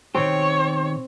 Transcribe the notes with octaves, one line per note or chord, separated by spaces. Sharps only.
B2 D#3 C4 G4 C#5